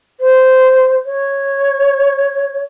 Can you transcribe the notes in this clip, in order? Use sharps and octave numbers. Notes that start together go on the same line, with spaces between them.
C5
C#5